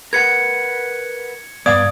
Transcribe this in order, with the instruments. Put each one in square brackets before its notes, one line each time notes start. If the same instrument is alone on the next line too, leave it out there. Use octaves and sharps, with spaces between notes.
[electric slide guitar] A#4 B4 F#5 [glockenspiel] G#6 C#7
[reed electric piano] G2 F5 G#6 [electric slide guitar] B3 [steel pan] D5 [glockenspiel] D#6